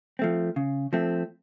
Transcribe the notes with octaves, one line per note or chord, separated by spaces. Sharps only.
F3 A3 C4
C#3
F3 A3 C4